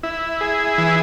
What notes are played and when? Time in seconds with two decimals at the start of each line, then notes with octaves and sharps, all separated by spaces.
0.03 E4
0.41 G#4
0.78 E3